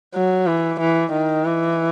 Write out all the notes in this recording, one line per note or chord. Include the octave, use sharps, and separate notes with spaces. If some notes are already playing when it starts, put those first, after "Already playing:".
F#3
E3
E3
D#3
E3